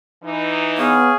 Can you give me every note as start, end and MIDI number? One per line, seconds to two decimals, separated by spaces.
0.24 0.98 52
0.24 0.98 63
0.78 1.10 59
0.78 1.17 68
0.78 1.17 73
0.78 1.17 77